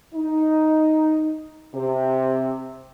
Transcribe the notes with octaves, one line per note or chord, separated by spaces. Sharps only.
D#4
C3